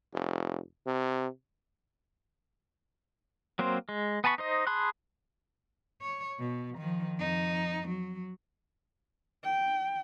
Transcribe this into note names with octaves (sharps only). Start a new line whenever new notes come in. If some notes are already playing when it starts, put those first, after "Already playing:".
F1
C3
F#3 A#3 C4 C5
G#3
B3 G#5 A5 B5 C#6
D#4 C5 D#5
G#4 A5 B5 C6 F#6
C#5
B2
D#3 F3
F2 D#4
F#3
G5